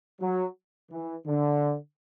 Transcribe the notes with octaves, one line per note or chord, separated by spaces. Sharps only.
F#3
E3
D3